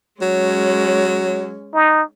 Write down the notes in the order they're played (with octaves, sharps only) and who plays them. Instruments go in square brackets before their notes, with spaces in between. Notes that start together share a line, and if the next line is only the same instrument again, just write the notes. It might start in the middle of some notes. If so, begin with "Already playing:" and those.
[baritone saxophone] F#3 [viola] G#3 C#4
[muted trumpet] D#4